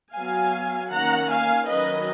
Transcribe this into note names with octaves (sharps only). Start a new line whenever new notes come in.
F#3 B3 F5 G#5
D#3 A#3 C#4 F#5 A#5
F5 G#5
D#3 F#3 C#4 B4 D#5